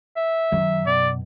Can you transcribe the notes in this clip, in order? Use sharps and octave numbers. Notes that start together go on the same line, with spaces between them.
E5
F#2 D#3 F#3 C#4
B2 D5